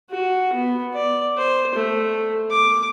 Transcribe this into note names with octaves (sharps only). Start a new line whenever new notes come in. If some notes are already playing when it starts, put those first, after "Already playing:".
F#4
B3
D5
C5
A3
D6